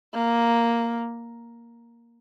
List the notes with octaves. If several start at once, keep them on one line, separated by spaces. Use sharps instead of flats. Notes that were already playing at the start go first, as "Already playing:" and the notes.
A#3